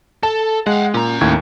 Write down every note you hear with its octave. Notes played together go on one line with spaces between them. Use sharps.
A4 A5
G#3 F5 F#5
A#2 C#4 A#5
D#2 A2 G#6